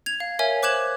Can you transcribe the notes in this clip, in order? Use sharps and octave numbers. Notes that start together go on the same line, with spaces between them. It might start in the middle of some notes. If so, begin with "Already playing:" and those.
G#6 F7
F5
A#4 C#5 E5 G#5
C5 D6 F#6 G#6 E7 F#7